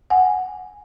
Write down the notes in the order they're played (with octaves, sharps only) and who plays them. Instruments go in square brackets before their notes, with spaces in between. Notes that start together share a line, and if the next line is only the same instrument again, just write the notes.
[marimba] F#5 G#5